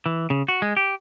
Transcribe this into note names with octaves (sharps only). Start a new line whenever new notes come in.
E3
C#3
F#4
G#3
G4